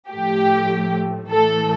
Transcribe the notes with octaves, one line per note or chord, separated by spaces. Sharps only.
A2 F3 A3 G4
A2 E3 A3 A4